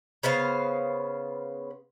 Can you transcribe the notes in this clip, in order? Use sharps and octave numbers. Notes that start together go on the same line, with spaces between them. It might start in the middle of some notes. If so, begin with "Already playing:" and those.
C#3 B3 C5 F5